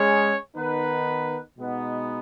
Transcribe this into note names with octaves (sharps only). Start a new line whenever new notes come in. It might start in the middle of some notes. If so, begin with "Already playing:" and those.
Already playing: G#3 C#4 G#4 C#5
D#3 B3 D#4 B4
B2 G#3 B3 D#4